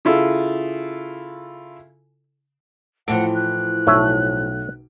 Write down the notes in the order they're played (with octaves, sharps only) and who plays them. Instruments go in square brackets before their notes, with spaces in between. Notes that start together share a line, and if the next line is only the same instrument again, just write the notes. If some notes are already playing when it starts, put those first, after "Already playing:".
[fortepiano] C#3 E4 F4 A4
[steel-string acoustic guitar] A2 E3 F3 [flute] F#5 [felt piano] D7
[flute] F#6
[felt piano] B1 [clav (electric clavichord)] A3 C#5 E5